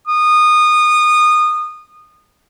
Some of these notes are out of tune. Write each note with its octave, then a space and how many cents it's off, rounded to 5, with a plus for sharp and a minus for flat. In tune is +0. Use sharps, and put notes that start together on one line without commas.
D#6 -25